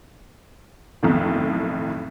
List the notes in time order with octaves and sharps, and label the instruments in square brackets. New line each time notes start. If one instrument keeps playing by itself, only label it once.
[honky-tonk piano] B1 F2 A2 D#3